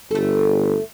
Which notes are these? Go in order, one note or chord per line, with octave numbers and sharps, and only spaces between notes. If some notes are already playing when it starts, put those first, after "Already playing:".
G1 A3 A4